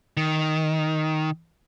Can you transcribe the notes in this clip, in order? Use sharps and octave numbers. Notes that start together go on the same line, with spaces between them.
D#3